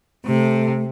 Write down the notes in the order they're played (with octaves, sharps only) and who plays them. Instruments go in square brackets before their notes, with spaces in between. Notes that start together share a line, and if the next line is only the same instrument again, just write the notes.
[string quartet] C3 [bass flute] A3